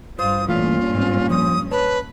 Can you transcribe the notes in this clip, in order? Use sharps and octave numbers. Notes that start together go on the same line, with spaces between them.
G2 F4 C5 D#6
G2 A#2 E3 A3 C#4 F4
G#2 C4
F3 D#6
B4 C#5 A5